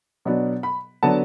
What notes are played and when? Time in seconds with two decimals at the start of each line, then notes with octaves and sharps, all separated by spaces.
0.25 B2 F#3 B3 D4
0.63 B5
1.03 D3 F#3 B3 D4 A5